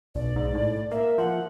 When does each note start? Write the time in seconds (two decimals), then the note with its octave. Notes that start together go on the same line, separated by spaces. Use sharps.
0.15 B1 D5
0.36 G#2
0.55 A2
0.92 A#3 E5
1.18 F3 F#5